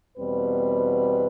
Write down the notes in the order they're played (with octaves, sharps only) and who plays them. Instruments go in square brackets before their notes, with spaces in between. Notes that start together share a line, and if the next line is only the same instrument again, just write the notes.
[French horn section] E2 B2 G3 C4 B4